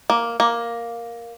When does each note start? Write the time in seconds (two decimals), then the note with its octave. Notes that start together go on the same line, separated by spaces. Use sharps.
0.10 A#3
0.40 A#3